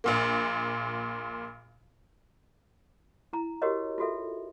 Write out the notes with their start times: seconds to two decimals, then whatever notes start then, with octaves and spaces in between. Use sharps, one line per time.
0.04 A#1 A#2 A#3
3.33 E4 A#5
3.62 F#4 G4 A#4 C#5 D#5
3.98 F4 F#4 A4 E5